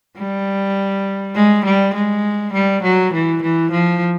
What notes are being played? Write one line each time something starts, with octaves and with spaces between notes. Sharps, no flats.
G3
G#3
G3
G#3
G3
F#3
E3
E3
F3